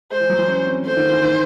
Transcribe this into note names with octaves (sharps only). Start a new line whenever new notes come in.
G#3 C5
E3
F#3
E3
C#4
C4
A3 C5
D#3
E3
D#3